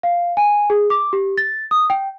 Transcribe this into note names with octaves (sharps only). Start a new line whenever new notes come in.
F5
G#5
G#4
D6
G4
A6
D#6
G5